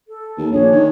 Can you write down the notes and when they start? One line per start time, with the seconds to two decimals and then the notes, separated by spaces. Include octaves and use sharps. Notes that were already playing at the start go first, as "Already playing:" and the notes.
0.08 A4
0.38 D#2
0.52 A#1 D4 G#4 C#5
0.72 D#3